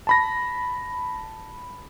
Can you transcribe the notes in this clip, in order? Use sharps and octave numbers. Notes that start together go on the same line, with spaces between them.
A5 B5 A#6